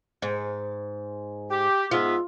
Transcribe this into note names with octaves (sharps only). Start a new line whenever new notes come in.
G#2
G4
G#2 B3 F4 E5